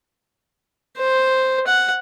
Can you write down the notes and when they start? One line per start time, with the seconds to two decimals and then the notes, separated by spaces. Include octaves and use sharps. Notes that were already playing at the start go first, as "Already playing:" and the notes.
0.97 C5
1.67 F#5